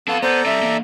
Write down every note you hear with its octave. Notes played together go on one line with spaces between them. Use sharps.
B3 C4 A4 F5 A5
B3 A4 C5 D5 A#5
G3 C4 E5
E3 A#3